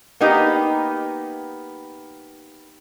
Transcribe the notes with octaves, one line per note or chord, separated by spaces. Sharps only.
A#3 B3 D#4 G4